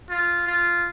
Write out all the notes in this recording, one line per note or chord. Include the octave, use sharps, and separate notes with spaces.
F4
F4